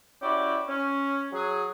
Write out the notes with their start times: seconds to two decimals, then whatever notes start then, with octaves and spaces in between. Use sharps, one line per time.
0.22 C#4 E4 F#4 G4 D5
0.69 C#4
1.33 F#3 G#4